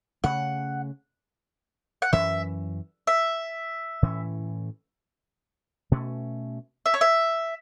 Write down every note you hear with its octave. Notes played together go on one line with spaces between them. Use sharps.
C#3 A3 C#4 F#5
F#5
F#2 E3 C#4 E5
E5
A2 E3 C#4
B2 A3 C#4
E5
C#5
E5